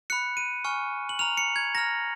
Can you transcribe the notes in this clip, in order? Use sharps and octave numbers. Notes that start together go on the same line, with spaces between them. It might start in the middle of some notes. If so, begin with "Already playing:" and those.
B5 F#6 C#7
D#7
G#5 C#6 F6
F#7
A#5 F6 F7
C#7
G#6
A#5 F6 A#6